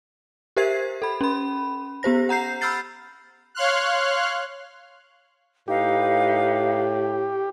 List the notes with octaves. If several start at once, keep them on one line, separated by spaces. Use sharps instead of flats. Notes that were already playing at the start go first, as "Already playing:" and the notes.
G4 A#4 C5 E5 G#6 C7
A4 B5
C#4 B5
B3 G4 C5 A#6
F#5 A#5 G6 C7
B5 E6 F6 G6 A6 C7
C#5 F5 C6 F6 F#6
A2 D#4 G4 B4 F5